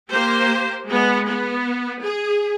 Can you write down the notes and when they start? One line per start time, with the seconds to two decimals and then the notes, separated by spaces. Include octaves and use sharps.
0.11 A#3 G4 C5
0.88 G#3 B3
1.27 B3
2.02 G#4